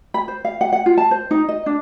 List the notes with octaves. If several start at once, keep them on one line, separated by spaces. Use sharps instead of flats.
B5
C5
F5
F#5
F#5
F4
A5
C5
D#4
D#5
D4